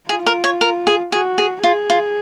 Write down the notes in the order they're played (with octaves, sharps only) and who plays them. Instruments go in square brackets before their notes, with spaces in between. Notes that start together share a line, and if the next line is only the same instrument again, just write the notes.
[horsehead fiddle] F4 [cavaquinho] G#4
[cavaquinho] A#4
C#5
A#4
G#4
[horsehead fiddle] F#4 [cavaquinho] G#4
[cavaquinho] G#4
[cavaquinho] F4 [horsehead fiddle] G#4
[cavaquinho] F4